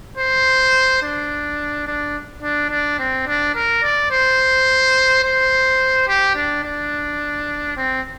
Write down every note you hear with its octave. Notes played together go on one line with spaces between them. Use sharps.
C5
D4
D4
D4
D4
C4
D4
A#4
D5
C5
C5
G4
D4
D4
C4